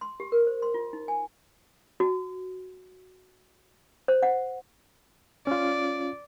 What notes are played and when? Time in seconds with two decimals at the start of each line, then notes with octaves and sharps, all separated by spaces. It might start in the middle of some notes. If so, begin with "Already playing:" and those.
0.01 C6
0.20 G4
0.32 A#4
0.47 C5
0.62 C6
0.74 F4
0.93 D#4
1.08 G#5
2.00 F#4
4.08 C5
4.23 F#5
5.47 C#4 F4 D5